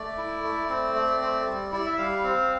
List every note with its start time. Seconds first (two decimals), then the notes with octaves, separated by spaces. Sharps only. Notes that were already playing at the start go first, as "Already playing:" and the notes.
Already playing: A3 D5
0.18 E4
0.44 A3
0.70 C4
0.95 A3
1.21 C4
1.46 G3
1.72 E4 D5
1.86 E5
1.98 G3 F5
2.24 C4